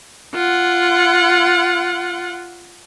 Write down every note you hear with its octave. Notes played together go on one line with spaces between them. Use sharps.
F4 F#5